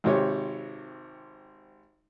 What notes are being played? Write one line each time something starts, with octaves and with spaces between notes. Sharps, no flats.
G#1 C3 C#5